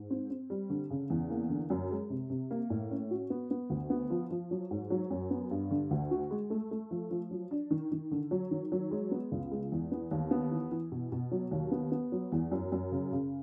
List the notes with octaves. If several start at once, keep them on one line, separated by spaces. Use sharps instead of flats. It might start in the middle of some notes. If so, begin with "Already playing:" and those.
Already playing: G#2
C4
C4
G3
D3
C#3
E2
A#3
D3
F#2
G#3
C3
C3
A#3
A2
C#4
F#4
B3
B3
D2
B3
F3
F3
F#3
G#2
F#3
F#2
B3
G2
D3
D2
F#4
G#3
A3
A3
F3
F3
F#3
D4
D#3
D#3
D3
F#3
D#3
F#3
G#3
B3
C#2
G#3
E2
B3
D#2
B3
E3
E3
B2
B2
F#3
D#2
B3
B3
F#3
E2
F#2
F#2
C#3
C#3